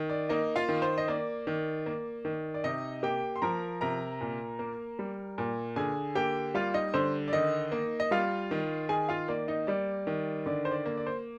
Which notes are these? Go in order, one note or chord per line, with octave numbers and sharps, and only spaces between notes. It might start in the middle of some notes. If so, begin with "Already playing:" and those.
Already playing: D#3
D5
A#3 D#4 D#5
F4 F5
D#3
C5
D#5
A#3 D5
D#3
A#3
D#3
D5
C3 D#4 D#5
A#3 G4 G5
C6
F3 A#4 A#5
C3 A#4 A#5
A#2
A#3
G3
A#2
D3 G#4 G#5
A#3 G4 G5
G3 F4 F5
D#4 D#5
D3 C5
D5
D#3 D#4 D#5
A#3
D#5
G3 F4 F5
D#3
D#3 G#4 G#5
F4 F5
A#3 D5
D#4 D#5
G3 D5
D#3
D3 D5
C5
D5
A#3
D5
C5